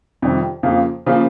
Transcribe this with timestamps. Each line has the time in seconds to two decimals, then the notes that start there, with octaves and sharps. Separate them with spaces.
0.22 F2 C3 D#3 G3
0.63 F2 C#3 F3 A#3
1.06 C#3 F3 A#3